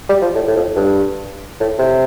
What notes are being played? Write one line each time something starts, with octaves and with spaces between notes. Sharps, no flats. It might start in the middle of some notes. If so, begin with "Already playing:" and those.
G3
F3
A2
A2
F2
G2
A2
C3